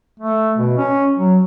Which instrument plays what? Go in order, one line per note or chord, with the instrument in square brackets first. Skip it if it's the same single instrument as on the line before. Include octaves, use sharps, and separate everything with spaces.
[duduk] A3
B2
C#4
F#3